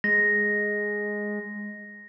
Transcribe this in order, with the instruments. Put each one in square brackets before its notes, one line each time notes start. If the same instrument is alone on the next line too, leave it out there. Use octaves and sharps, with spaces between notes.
[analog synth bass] G#3 [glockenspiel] A#6